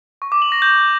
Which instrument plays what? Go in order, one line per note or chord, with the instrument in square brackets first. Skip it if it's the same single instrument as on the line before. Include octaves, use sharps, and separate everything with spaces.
[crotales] C#6
D6
F#7
A#6
G6